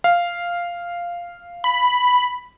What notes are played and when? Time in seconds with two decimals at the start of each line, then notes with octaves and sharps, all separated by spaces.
0.04 F5
1.64 B5